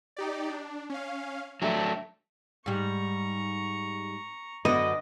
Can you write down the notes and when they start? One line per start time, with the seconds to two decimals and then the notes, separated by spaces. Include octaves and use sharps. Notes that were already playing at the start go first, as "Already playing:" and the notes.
0.17 D#4 G4 D5
0.49 D4
0.90 C#4 F5
1.62 F3 F#3 A3 D4
2.66 G#2 G3 A#5 C#6
4.65 F#2 D3 B3 F#4 D5 D#5